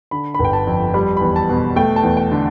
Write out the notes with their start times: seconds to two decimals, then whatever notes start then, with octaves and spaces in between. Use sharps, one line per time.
0.11 D3 B5
0.34 G1 B5
0.45 G5
0.53 A5
0.67 F2
0.94 G3 B5
1.17 E2 B5
1.36 A5
1.49 B2
1.76 A3 G5
1.96 A5
2.03 E2
2.17 G5
2.32 D3